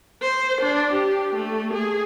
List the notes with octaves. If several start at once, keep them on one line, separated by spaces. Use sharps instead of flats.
C5
D4
G4
A3
G#4